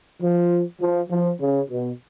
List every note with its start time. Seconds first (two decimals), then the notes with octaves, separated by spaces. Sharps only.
0.21 F3
0.80 F3
1.10 F3
1.40 C#3
1.70 B2